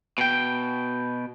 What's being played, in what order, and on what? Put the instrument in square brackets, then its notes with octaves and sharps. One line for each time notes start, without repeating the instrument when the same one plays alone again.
[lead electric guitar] B2 G5